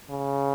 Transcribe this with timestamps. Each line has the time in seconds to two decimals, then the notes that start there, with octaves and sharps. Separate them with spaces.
0.10 C#3